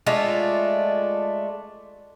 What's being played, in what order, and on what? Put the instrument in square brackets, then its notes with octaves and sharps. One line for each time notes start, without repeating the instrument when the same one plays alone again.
[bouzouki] G#3 A3 D4 F4